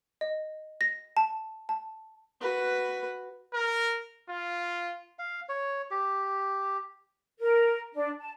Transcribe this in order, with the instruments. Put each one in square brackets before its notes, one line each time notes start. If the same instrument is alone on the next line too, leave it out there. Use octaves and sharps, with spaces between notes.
[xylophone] D#5
A#6
A5
A5
[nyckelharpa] F#4 B4
[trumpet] A#4
F4
[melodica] F5
C#5
G4
[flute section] A#4
D4
A5